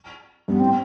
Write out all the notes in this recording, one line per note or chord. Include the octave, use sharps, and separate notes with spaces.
G2 B3
A2 C4